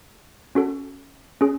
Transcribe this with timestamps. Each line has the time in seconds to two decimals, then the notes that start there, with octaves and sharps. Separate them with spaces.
0.55 C#4 F#4 A4
1.41 C#4 G#4